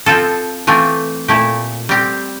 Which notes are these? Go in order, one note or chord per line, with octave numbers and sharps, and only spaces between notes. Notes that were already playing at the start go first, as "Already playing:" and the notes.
F3 C4 F4 A4
E3 A3 C4 F4
A#2 A3 E4 G4
G3 C4 G4